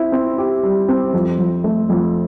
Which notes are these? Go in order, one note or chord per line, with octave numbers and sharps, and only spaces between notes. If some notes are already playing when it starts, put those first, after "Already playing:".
Already playing: C4 E4
C4
G4
G3
C4
F2
F2
A3
F2